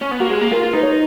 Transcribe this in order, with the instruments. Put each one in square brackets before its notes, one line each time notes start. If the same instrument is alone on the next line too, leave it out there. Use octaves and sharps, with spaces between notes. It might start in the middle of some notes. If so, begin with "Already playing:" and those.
[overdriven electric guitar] C#4
B3
[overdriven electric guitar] A#3 [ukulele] F#4
[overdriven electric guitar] G#3 [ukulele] G#4
[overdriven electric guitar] A#3
[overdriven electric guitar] F4 [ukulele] A#4
[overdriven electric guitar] F4
[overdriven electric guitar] D#4 [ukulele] B4
[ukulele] C#5